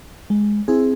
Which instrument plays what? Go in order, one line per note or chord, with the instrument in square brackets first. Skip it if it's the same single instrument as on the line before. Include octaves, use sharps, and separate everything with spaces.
[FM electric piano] G#3
C4 E4 G#4